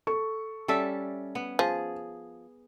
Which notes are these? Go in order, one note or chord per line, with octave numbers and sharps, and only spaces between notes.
A4 C#6
G3 C#4 A4 E5
B3
F3 G#4